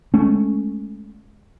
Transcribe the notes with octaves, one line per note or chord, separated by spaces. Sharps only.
G#3 A3 C#4